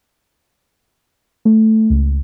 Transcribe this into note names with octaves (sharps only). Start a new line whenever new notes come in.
A3
C#2